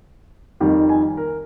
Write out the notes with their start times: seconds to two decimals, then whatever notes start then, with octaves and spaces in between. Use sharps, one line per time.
0.60 F2 D#3 G3
0.89 G#5
1.17 A#4